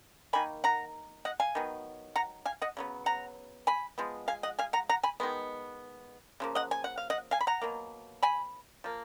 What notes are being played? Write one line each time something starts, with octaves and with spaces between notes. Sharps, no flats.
D#3 A#3 G#5 B5
F#5 A#5
D#5 F#5
F5 G#5
D#3 F#3 B3
F#5 A#5
F5 G#5
D#5 F#5
C#3 F#3 B3
F#5 A#5
G#5 B5
F3 G#3 B3
F5 G#5
D#5 F#5
F5 G#5
F#5 A#5
F#5 A#5
G#5 B5
D#3 G#3 B3
C#3 F3 A#3
D#5 F#5
G#5
F#5
F5
D#5 F#5
F5 G#5
B5
F#5 A#5
B2 F#3 A#3
G#5 B5
F3 A#3